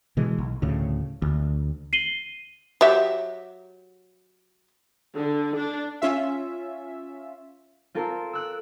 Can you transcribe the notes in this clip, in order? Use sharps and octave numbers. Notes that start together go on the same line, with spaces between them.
B2 E3 G#3
B1
D2 A2 C#3
D2
C7 D#7 F#7 G7
F#3 G4 E5
D3
D4
C#4 F4 E5
C4 F4 A4 A#4
E6 F#6 D7